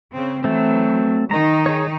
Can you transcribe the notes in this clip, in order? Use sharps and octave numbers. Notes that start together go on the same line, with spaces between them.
C#3 C4
E3 F#3 A3 C4
D#3 D#4 A#5
G#4 C#5